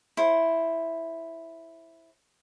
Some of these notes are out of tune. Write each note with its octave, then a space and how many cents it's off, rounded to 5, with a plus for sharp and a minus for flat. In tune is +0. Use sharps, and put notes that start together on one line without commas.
E4 +0 C5 +15